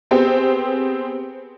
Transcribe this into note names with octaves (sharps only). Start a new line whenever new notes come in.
B3 C4 G4 G#4 C5